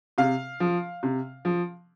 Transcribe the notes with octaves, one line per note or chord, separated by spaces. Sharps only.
C3 F5
F3
C3
F3